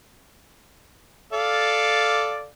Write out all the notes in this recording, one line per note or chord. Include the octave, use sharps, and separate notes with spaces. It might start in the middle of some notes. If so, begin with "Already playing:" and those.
A4 D5 F5